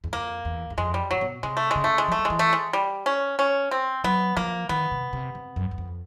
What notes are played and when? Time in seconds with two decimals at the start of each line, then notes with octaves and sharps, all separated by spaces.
0.04 E2
0.13 F2 A#3
0.45 E2
0.70 E2
0.77 F2 G#3
0.94 G3
1.11 A#2 F#3
1.21 B2
1.43 C3 G#3
1.57 A3
1.71 C#3 G#3
1.84 A3
1.98 G#3
2.08 F3
2.12 A3
2.19 F3
2.25 G#3
2.30 E3
2.39 A3
2.53 G#3
2.73 G3
3.06 C#4
3.39 C#4
3.71 C4
4.04 F#3 B3
4.37 F3 A#3
4.69 D#3 B3
4.91 C3
5.13 C3
5.35 C3
5.56 F#2
5.71 E2
5.78 F2